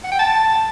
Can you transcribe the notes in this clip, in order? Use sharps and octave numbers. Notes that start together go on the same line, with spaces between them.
F#5
G5
A5